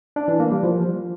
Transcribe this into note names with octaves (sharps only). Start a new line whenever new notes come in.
D4
E3
A#3
G3
F3